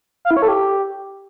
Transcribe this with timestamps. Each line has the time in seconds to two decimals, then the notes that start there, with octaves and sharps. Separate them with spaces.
0.25 F5
0.31 E4
0.37 C#5
0.42 A4
0.48 G4